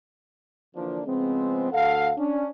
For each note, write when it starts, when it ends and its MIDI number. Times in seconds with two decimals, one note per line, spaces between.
0.75 1.02 50
0.75 1.02 52
0.75 1.02 53
0.75 1.02 58
0.75 1.02 62
1.06 1.70 49
1.06 1.70 53
1.06 1.70 56
1.06 1.70 59
1.06 1.70 60
1.72 2.12 38
1.72 2.12 69
1.72 2.12 77
1.72 2.12 78
2.18 2.47 61
2.18 2.47 62